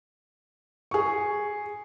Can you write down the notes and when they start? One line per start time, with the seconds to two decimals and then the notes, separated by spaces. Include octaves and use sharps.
0.91 G#4 C#6